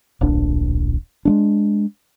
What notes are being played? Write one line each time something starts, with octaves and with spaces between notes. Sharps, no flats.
D1 A#1 D4
G#3 A3 D4